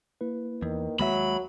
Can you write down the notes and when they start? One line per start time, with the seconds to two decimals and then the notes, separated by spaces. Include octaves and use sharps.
0.21 A#3 E4 B4
0.62 E2 D#3
0.99 D#2 F#3 G#3 E5 B5